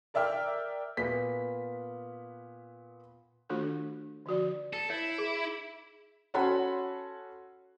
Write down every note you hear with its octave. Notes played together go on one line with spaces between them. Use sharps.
A#4 D5 E5 G5 F6
A#2 B3 B6
D#3 A3 D4 F4 F#4 A4
D3 F3 F#4 D5
A4
E4 C#5
G#4
C#4 F#4 A4 F#5 B5 C6